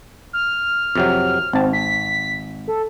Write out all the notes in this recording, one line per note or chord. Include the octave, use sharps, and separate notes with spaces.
F6
F2 C3 F#3
G#1 C4 A5
B6
A4